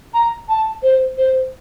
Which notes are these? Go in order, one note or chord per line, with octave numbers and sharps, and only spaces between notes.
A#5
A5
C5
C5